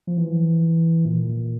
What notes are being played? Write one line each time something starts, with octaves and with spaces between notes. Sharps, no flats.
F3
E3
A#2